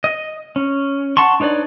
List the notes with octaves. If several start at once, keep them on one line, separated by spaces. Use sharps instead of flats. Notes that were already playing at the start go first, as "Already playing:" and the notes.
D#5
C#4
F#5 A5 C6 C#6
D4 D#4 B4 C#5 D5